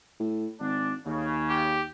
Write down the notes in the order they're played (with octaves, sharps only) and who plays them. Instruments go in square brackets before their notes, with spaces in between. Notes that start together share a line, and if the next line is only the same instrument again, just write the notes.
[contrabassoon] A2
[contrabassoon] G#1 [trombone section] D4
[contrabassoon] D#2 [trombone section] C#3
[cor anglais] G4